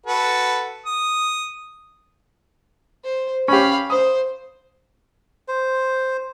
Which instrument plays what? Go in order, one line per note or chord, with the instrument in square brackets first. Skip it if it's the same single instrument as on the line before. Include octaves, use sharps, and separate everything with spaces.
[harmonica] F#4 A4 B4
D#6
[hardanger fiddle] C5
[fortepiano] C#4 G4 [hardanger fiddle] F5 B5
[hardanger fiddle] C5 [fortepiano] D#6
[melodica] C5